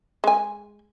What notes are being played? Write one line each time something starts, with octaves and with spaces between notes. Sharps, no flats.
G#3 G#5